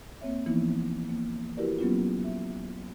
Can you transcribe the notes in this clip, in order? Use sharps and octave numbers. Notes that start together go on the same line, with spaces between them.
A#3 C4 C#5 E5
E3 F3 A#3 B3 D#4 E4
A#3
E4 F#4 G4 A#4 B4 D5
F#3 A#3 B3 C#4 E4 F4
E5